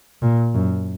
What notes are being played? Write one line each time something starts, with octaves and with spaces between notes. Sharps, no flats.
A#2
F#2